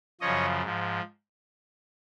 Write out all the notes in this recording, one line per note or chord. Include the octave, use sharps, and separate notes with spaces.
F#2 C#3 F3 C#5 D#5
G#2 F3